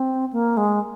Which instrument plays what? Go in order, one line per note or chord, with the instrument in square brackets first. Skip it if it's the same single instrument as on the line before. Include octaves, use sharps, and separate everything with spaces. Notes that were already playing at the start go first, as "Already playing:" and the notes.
Already playing: [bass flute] C4
A#3
G#3